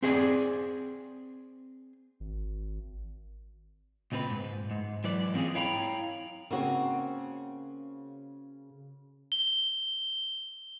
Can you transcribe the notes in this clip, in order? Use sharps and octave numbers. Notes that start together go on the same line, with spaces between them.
C4 G#4 D5 G#5
G#1
C#2 A#2 C4 A4 B4
G#2
G#2
E3 F#3 B4 D5
G#2 A#3 C4 C#4 F4 G#4
E4 C#5 F5 G5 A#5 B5
C#3 A#3 C4 F#4
G7